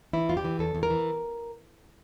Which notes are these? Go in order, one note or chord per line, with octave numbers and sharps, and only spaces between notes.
E3 E4
E2 F4
G4
E3
E2 A4
E2
A#4
E3